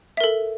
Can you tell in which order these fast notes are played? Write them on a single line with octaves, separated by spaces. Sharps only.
E5 A#4 A4